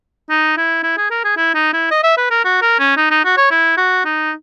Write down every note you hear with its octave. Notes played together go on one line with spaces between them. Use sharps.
D#4
E4
E4
G#4
A#4
G#4
E4
D#4
E4
D#5
E5
B4
A#4
F#4
A#4
C#4
D#4
D#4
F#4
C#5
E4
F#4
D#4